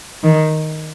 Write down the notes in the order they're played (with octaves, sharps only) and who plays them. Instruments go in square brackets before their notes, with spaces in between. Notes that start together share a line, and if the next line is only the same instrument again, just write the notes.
[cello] D#3